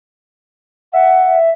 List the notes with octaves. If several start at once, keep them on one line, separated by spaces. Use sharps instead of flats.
E5 F#5